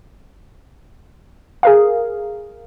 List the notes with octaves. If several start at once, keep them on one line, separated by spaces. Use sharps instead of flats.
G#4 A#4 F5